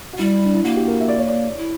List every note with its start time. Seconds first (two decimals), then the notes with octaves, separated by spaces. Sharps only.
0.13 F#4
0.18 G3 E4
0.45 D4
0.55 E4
0.64 A#3 F#4
0.77 G4
0.88 A#4
1.00 E5
1.08 D5
1.18 C#5
1.28 D5
1.57 E4